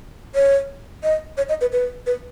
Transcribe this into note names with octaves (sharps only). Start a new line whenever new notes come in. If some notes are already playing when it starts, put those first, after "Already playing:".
C#5
D#5
C#5
D#5
B4
B4
B4